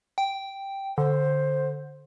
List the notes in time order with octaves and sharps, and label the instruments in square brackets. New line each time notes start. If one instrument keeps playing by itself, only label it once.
[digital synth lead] G5
[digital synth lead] D3 [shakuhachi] C5